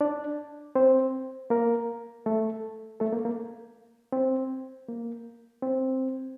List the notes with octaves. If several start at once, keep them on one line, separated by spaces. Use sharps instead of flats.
D4 D5
C4 C5
A#3 A#4
A3 A4
A3 A4
A#3
A#3
C4
A#3
C4